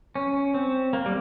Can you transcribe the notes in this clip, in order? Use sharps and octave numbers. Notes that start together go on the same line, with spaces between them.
C#4
C4
A#3
G3